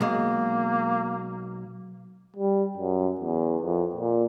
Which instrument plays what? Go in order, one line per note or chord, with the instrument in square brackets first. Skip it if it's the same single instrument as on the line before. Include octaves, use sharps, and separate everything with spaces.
[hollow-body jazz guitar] B1 G#3 [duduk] A#3
[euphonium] G3
F#2
E2
F2
A#2